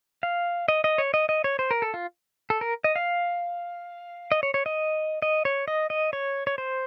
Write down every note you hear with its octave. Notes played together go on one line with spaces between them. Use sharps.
F5
D#5
D#5
C#5
D#5
D#5
C#5
C5
A#4
A4
F4
A4
A#4
D#5
F5
D#5
C#5
C#5
D#5
D#5
C#5
D#5
D#5
C#5
C#5
C5